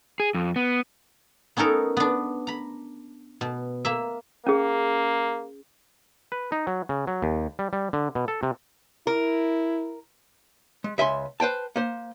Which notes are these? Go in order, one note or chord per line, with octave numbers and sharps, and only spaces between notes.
G#4
F2
B3
B3 C#4 D#4 A4 A#4
B3 D4
A#5 B5
B2
A#3 E5
A#3 C#4 G#4
B4
D#4
F#3
C#3
F#3
D#2
G3
G3
D3
B2
A4
C3
E4 A#4
G#3
C#2 E5 G#5 C6
B4 C5 G5 A5
A#3 C5